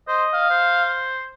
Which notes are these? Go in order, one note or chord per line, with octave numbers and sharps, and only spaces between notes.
C5 D#5
F5
C5